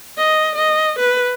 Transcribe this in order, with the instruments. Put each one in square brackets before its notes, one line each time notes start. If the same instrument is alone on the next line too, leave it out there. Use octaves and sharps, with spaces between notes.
[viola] D#5
D#5
B4